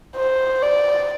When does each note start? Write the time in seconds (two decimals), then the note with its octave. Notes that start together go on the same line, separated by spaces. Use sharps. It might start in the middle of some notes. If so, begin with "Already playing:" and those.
0.16 C5
0.62 D5